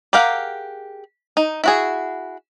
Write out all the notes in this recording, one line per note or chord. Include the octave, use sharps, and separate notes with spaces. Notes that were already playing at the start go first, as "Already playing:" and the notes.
G4 G#4 A#4 F5 F#5
D#4
E4 F#4 G#4